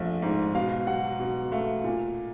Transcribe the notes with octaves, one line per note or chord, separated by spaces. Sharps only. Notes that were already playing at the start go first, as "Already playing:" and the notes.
Already playing: A#1 A3 E5
G#2
B2 F5
F#3 F#5
B2
A3 F5
A#2